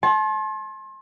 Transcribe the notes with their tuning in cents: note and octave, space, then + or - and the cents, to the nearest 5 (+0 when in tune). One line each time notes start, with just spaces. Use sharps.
A5 -35 C6 +35